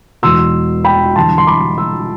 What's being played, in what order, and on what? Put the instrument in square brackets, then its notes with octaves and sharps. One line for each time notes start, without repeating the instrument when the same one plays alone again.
[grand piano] E1 E2 B2 C6 E6
G5 B5
E1 E2 D3 G3 A5 C6
C6
B5 D6
C6 E6